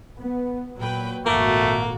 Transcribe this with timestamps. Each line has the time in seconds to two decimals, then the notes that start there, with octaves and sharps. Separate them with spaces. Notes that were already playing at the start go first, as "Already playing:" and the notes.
0.18 B3
0.78 A#2 F#3 B4 G5
1.26 G#1 F2 A#2 A3 A#3 F#4 A4